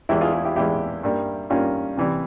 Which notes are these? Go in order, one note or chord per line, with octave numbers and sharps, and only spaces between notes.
E2 E3 G#3 E4 G4
F4 G#4
F4 G#4
E4 G4
E2 E3 G#3 E4 G4
G2 G3 A#3
G2 G3 A#3 C#4 F4
C3 E3 G3